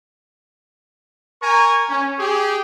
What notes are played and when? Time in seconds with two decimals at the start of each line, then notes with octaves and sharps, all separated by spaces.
1.41 A#4 G#5 A#5 C#6
1.89 C#4
2.19 G4 G#4